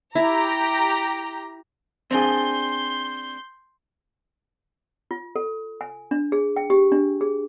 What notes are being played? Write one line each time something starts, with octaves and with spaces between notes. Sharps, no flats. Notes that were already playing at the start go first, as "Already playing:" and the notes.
E4 G4 A#5
C4 D4 G#4 C6 G6
F4
A4
G#5
D4
G#4
G5
G4
D4
G#4